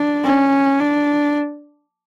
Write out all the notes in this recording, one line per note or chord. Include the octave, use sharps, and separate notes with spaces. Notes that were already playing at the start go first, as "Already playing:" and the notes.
Already playing: D4
C#4
D4